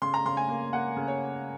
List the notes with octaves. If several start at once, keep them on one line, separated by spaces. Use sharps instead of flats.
C#3 C6
A#5
C#3 C6
G#5
A#3
A#3 F#5
C#3
C#5